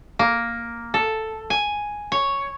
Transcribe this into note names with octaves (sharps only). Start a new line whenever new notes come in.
A#3
A4
G#5
C#5